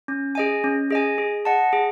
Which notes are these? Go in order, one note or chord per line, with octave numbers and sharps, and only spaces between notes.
C#4
G#4 D#5 G#5
C#4
G#4 D#5 G#5
G#4
D#5 F#5 A5
G#4